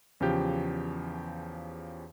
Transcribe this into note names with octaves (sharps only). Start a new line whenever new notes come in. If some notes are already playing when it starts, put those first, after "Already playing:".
E2 C#3 F3 G4 G6